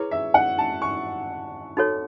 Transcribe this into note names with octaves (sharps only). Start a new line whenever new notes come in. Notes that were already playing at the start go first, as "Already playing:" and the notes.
Already playing: E4 G#4 B4 C#5
E5
F#5
A5
C#6
D#4 F#4 A4 C#5